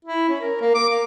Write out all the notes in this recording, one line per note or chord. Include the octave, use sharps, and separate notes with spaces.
E4
C#4
A#4
A#3
D6
A#3